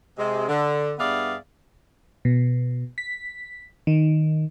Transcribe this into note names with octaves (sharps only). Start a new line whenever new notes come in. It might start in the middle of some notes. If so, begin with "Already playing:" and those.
C3 G#3
D3
G2 B3 G#4 D5 E5 F5
B2
B6
D#3